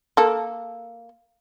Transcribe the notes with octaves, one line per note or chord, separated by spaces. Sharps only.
A#3 A4